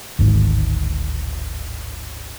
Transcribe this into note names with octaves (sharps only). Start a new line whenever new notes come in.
D1 G#1 G#2